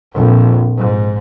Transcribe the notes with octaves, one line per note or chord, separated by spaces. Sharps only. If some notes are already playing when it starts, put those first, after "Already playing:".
A#1 F2
G#2